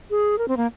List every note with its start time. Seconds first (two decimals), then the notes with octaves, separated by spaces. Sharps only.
0.10 G#4
0.38 A#4
0.48 C4
0.57 A#3